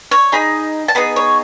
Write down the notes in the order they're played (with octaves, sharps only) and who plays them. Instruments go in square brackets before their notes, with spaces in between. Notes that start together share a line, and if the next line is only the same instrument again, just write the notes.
[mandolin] C#5
D#4 G#4 B5
A5
B3 D#4 G#4 B5
C#5